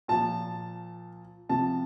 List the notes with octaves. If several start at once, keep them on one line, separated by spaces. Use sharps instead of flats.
A#2 F3 A5
C3 F3 A5